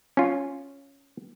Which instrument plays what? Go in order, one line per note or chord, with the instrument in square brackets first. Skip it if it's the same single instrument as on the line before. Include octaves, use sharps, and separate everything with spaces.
[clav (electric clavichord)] C#4 F4